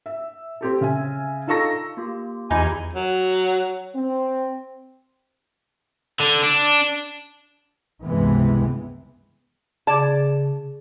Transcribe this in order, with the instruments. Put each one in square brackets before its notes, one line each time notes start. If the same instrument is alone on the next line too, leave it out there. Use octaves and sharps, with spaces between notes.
[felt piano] E5
C4 G4 A4
C#3 E5 G#5
D#4 F4 A4 A#5 C#6 A#6
[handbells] A#3 F4 G4
[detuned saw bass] E2 [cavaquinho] D#4 [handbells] F4 G4 B5 [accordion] G#5
[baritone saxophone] F#3
[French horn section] C4
[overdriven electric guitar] D3
D4
[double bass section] C#2 G2 C3 E3 G#3 B3
[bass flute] C#3 [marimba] G#4 D6 G#6 [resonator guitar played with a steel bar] D5 A5